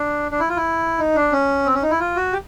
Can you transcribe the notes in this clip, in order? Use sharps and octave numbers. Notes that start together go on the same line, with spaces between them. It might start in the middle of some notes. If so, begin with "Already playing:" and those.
Already playing: D4
D4
E4
F4
E4
D#4
D4
C#4
C4
C#4
D#4
E4
F4
F#4
G4